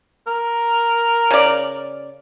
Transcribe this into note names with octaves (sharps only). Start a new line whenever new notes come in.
A#4
C#3 D5